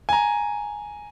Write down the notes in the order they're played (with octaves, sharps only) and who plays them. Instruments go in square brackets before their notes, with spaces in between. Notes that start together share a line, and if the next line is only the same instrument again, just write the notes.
[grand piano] G#5 A#5